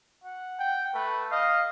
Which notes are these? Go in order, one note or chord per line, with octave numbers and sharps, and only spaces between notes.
F#5
G5
A3 B4
D#5 F5